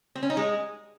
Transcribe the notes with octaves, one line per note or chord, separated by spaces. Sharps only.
C4
C#4
D#4
G#3